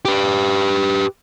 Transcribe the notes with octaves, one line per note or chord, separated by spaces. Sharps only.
G4 B4